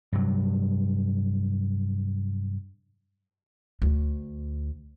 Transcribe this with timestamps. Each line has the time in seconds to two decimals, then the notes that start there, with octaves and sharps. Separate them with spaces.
0.12 G2 C3 F#3
3.82 D2